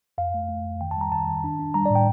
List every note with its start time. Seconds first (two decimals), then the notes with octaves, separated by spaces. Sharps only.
0.18 F2 F5
0.34 A3
0.49 A3
0.65 F2
0.81 D#3 G5
0.91 A5
0.97 G3 A#5
1.12 D#3 A5
1.28 D#3
1.44 D4
1.59 D4
1.74 G3 A#5
1.86 D5
1.90 A2
1.96 G5